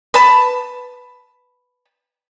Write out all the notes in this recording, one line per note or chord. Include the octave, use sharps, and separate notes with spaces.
B4 A5